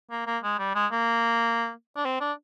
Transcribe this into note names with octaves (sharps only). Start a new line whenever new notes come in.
A#3
A#3
G#3
G3
G#3
A#3
D4
C4
D4